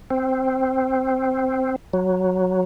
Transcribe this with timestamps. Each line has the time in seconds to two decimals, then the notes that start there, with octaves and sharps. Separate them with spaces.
0.10 C4
1.93 F#3